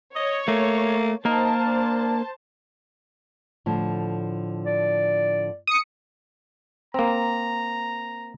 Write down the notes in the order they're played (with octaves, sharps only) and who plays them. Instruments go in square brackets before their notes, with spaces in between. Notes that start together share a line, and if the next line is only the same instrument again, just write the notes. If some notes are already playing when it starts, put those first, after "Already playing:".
[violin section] C#5 [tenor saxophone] D#5
[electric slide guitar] A3 [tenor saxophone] A#3
[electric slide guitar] A#3 A#4 [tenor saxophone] D#4 [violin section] C5 A5
[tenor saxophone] D4
[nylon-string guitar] A2 D3 F3
[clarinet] D5
[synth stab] D#6 C#7
[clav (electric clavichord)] A#3 C4 [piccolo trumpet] A#5